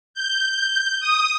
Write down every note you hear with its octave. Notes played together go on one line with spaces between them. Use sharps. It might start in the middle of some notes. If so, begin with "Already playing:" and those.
G6
D#6